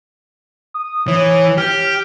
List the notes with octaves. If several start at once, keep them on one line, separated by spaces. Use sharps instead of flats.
D#6
E3 C#5
G4 F6